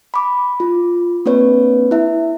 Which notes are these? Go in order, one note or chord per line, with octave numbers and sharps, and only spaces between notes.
B5 D6
F4
A#3 C4 D4 B4 C#5
E4 E5